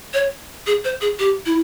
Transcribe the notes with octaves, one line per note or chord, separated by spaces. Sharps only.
C#5
G#4
C5
G#4
G4
E4